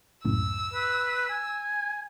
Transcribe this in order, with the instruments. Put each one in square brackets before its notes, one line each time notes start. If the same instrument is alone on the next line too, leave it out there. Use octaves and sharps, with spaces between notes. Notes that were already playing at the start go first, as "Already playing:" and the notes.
[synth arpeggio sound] C#2 F#2 A2 [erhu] E6
[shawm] B4
G#5